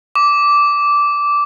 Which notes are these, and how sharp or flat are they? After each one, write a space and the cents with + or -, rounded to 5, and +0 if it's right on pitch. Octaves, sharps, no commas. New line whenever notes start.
D6 -10